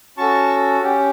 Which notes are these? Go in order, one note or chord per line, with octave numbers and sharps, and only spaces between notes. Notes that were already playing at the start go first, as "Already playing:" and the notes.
C#4 F#4 A4 A5 C#6
C#4 G4